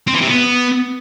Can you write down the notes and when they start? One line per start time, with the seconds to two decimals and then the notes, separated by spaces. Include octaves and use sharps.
0.07 C4
0.14 E3
0.21 C3
0.28 B3